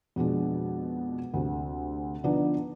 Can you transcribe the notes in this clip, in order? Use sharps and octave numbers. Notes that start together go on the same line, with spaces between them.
F2 B2 G#3 D4
D2 C3
D3 F3 B3 D4 D#4